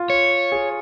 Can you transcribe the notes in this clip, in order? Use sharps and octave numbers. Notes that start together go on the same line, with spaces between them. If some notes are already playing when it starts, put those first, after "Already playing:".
Already playing: F4
C#5
G#4